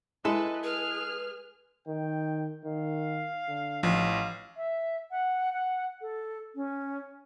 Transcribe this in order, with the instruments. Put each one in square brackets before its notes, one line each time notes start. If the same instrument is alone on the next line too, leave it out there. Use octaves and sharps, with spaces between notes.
[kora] G#3 A4 [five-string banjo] E4 [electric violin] B4 D#5
[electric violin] G#4 F6 [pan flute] B4
[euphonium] D#3 [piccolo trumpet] G5
[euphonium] D#3 [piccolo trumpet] F5
[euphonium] D3
[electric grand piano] A1 [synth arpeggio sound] F3 [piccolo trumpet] F5
[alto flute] E5
F#5
F#5
A4
C#4